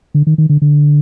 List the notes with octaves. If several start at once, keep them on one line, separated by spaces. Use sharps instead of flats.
D3
D#3
D#3
D3
D3